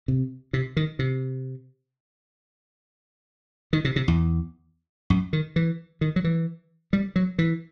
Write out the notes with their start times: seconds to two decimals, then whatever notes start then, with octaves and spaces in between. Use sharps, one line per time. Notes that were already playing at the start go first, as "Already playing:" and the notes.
0.08 C3
0.53 C3
0.77 D#3
0.99 C3
3.73 D#3
3.85 C3
3.96 C3
4.08 E2
5.10 F#2
5.33 D#3
5.56 E3
6.01 D#3
6.16 F#3
6.24 E3
6.93 G3
7.16 F#3
7.39 E3